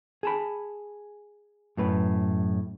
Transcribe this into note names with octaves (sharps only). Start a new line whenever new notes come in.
G#4 A5 B5
F#2 A2 B4